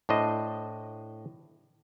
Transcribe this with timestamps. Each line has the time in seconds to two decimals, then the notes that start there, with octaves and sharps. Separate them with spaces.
0.09 A2 D4 C5 D#5